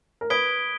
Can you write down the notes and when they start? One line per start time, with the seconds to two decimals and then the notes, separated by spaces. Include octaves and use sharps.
0.21 A#4
0.30 B4 D#6 G#6 B6 D7 G7